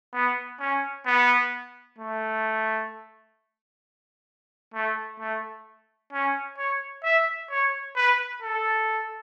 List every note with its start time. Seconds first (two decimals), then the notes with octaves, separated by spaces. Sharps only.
0.13 B3
0.60 C#4
1.06 B3
1.98 A3
4.74 A3
5.20 A3
6.13 C#4
6.58 C#5
7.04 E5
7.50 C#5
7.96 B4
8.42 A4